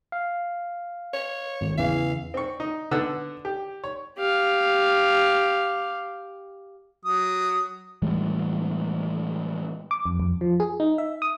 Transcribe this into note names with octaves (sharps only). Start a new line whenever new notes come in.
F5
C#5
G#1
E2 C#3 E3 F5
C4 C#6
D#4
D3 B3 F#5 E6
G4
C#5
G4 F5
F#3 D#6
A2 E3 G3 G#3
D6
F2
F2
F3
G#4
D#4
E5
D#6